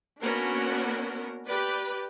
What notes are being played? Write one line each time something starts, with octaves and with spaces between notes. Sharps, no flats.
A#3 B3 C#4 D4 F#4 A#4
G4 B4 D5